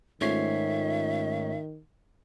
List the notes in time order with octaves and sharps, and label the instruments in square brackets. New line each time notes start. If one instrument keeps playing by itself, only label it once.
[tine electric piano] G#2 C#5 C7 [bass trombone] D#3 [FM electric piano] A3 C#4 F4 [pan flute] E5